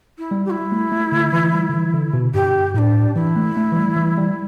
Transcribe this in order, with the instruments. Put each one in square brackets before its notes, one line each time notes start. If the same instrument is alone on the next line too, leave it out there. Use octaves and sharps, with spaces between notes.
[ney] E4
[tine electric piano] G3
[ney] G4
E4
[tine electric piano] A3
A3
D3
E3
G3
D3
E3
D3
B2
[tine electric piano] G2 [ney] G4
[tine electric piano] A2 [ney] D4 E4
[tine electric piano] E3 [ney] E4
[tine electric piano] A3
A3
E3
G3
E3
G3